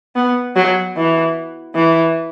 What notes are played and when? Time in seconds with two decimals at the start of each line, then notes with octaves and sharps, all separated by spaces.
0.15 B3
0.56 F#3
0.96 E3
1.74 E3